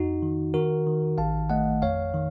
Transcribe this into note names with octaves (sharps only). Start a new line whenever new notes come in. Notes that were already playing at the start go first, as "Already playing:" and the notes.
Already playing: F2 D#4 F#4
D#3
D#3 F#4 A#4
D#3
A1 F5 A5
A3 D#5 F#5
F2 C#5 F5
D#3